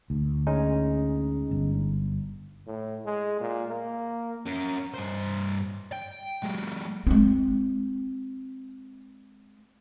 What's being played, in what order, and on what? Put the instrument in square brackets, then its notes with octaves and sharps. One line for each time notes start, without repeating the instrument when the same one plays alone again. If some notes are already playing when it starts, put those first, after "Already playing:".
[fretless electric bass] D2
[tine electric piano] G#3 C#4 D#4
[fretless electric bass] G1
[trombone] A2
G#3
A#2
A#3
[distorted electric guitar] C#4 A#4
G2 C5
G5
F#3 G#3
[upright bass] G#3 C4